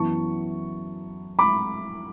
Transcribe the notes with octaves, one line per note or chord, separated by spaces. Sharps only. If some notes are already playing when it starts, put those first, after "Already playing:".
Already playing: F#2 E3 B3 E4 A5 C#6
B5 D6